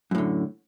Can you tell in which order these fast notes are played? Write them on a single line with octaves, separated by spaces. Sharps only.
F#2 A2 D3